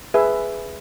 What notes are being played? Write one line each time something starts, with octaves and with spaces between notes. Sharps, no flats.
G#4 B4 E5